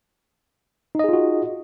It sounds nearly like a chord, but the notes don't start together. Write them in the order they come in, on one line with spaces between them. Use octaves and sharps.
D#4 D#5 G#4 F4 F#4